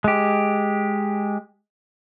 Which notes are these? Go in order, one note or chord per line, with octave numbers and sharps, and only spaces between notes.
G#3 G4